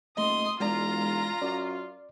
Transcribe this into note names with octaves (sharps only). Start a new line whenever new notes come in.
D#1 A3 D#5 C6 D#6
E1 G#3 F4 D5 A#5
F#2 D5